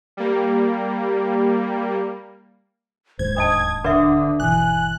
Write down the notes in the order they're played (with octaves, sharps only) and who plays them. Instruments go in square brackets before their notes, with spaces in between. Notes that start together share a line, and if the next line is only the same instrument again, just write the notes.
[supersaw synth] G3 A#3
[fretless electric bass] D1 D#2 G#2 [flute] C5 [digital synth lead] G#6
[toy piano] D4 D#5 A5 [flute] D#6
[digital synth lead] D3 [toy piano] B4 D5 E5 [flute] D#6
[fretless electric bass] G1 B2 E3 [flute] G#5 [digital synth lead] F#6